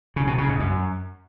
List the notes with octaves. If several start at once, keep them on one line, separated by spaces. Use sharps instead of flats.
C#3
B2
C#3
G#2
F#2